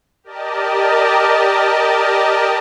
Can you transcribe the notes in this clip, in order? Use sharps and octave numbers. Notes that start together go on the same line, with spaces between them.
G4 A#4 D5 D#5 A5